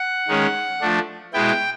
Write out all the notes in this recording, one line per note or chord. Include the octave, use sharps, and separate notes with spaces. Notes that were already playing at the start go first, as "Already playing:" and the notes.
Already playing: F#5
D#3 G#3 C#4
F3 A3 D4
B2 G#3 B3 E4 G5